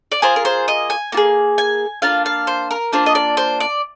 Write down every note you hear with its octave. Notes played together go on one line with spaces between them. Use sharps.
D5
A#3 F4 G#4 C5
A#4
C5
D#5
G#5
A#3 F4 G#4
G#5
A#3 D4 F4 F5
F5
C5
A#4
A#3 D4 F4 C5
D#5
D5
C5
D5